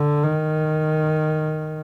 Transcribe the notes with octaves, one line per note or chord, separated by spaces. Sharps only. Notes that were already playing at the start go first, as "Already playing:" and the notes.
Already playing: D3
D#3